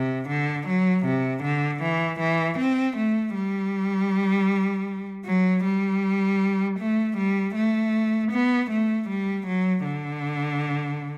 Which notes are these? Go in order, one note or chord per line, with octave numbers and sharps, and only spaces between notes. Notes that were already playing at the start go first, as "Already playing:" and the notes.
Already playing: C3
D3
F#3
C3
D3
E3
E3
C4
A3
G3
F#3
G3
A3
G3
A3
B3
A3
G3
F#3
D3